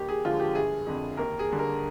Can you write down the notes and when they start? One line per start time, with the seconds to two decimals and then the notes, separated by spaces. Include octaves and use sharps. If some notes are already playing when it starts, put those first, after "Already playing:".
Already playing: D#2 G4
0.09 G#4
0.25 D3 F3 G#3 F4
0.40 G4
0.55 G1 G#4
0.86 F2 D3
1.17 D#2 A#4
1.39 G#4
1.49 D3 G3
1.59 A#4